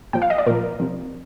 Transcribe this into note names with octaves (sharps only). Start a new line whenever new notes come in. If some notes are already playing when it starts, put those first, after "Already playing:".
A#2 F3 G5
F5
D#5
D5
A#2 F3 A#4
C3 F3